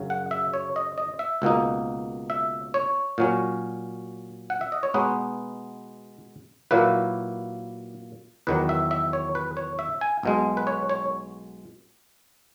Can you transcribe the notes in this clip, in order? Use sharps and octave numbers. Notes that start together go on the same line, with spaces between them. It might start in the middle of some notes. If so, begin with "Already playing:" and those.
Already playing: F#2 C#3 F#3
F#5
E5
C#5
D#5
D#5
E5
C#2 B2 A#3 D#4
E5
C#5
A#2 F#3 C#4
F#5
E5
D#5
C#5
B2 G#3 B3 D#4 B4
A#2 F#3 A#3 E4 B4
E2 D#3 F#3 B4
E5
E5
C#5
B4
C#5
E5
G#5
B1 B2 G#3
B4
C#5
C#5